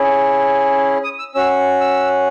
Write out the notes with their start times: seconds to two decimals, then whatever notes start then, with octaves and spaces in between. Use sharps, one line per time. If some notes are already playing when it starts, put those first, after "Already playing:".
Already playing: C#4 E4 G#4
1.04 D#6
1.19 E6
1.35 C#4 F#4 E6
1.81 E6